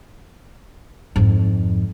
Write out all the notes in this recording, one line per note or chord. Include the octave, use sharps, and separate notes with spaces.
F2 G#2